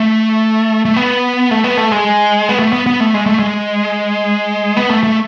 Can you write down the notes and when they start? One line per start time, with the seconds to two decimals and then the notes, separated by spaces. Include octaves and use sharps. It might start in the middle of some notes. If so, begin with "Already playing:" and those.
Already playing: A3
0.85 A3
0.97 B3
1.51 A3
1.64 B3
1.77 A3
1.92 G#3
2.49 B3
2.59 A3
2.73 B3
2.86 B3
3.00 A3
3.14 G#3
3.26 A3
3.39 G#3
4.77 B3
4.90 A3
5.03 A3